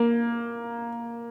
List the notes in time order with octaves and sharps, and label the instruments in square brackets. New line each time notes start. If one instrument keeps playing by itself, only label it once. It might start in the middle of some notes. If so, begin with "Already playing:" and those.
Already playing: [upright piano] A#3